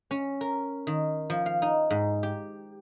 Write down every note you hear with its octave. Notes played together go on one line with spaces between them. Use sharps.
C#4
A#4
D#3
F3
F5
D#4
G#2
G4